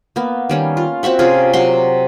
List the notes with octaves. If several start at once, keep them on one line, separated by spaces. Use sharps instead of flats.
A#3 B3
D#3 G3 C#4
F4
C4 F#4 E5 F#5
C3 C#4 F4 G#4
C3 F#3 F#5 C6